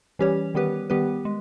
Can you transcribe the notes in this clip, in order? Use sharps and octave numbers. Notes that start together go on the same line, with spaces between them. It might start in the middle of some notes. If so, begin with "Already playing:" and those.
E3 G3 C#4 G4 C#5
D#3 G3 B3 G4 B4
D#3 G3 B3 G4 B4
G#3